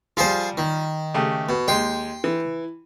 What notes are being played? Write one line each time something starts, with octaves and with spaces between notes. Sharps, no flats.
F3 G3 F4 G#4 C5
D#3
C#3 A3 G4
B2
D#2 G#3 G5 C6
E3